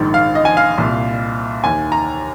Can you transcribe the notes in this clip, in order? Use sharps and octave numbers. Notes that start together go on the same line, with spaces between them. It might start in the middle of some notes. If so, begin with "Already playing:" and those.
Already playing: A#1 G#2 D#3
F5
D#5
G#5
F5
C2 A#2
D#2 D#3 G#5
A#5